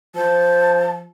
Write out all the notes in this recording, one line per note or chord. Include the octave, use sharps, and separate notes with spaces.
F3 C5 A5